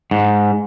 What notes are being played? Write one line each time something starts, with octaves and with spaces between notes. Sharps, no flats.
G#2